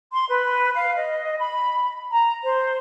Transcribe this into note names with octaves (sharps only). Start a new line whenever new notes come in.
C6
B4
F5
D#5
B5
A#5
C5